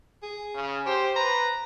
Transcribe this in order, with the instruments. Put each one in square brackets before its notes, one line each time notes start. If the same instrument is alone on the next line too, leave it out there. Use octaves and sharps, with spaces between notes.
[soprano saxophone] G#4
[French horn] C#3
[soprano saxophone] G4 [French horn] C5
[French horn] B4 [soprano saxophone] A#5